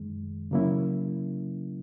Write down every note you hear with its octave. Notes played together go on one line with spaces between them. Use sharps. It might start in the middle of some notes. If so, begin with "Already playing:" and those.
Already playing: F#2 D#3 G#3
C#3 F#3 A#3 C#4 E4